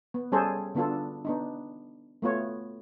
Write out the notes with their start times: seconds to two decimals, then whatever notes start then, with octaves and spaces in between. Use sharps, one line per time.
0.14 B3
0.32 G3 C#4 G#4 A4 C5
0.75 D3 B3 D4 F4 A4
1.25 B3 D4 D#4
2.22 A3 B3 F4 C#5